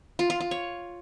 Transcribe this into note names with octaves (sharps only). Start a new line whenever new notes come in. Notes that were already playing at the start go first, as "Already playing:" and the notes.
F4
F4
F4
C#5